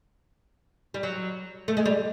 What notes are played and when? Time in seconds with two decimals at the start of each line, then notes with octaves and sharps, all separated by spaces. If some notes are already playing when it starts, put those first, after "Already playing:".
0.94 G3
1.03 F#3
1.68 A3
1.77 G#3
1.86 G3